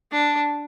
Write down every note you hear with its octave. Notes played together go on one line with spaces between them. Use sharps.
D4